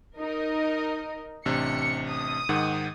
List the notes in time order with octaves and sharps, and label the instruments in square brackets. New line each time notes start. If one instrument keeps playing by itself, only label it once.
[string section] D#4 A#4 D#5
[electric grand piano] A1 C3 D4 [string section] C#7
[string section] D#6
[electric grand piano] G#2 D#3 F#5